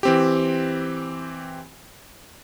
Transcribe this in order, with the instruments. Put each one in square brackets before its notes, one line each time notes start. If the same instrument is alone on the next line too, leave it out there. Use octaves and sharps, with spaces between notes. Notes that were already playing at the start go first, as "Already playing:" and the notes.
[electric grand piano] E3 C4 G4